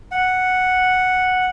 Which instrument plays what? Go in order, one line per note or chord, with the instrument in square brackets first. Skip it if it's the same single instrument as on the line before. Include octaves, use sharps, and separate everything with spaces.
[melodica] F#5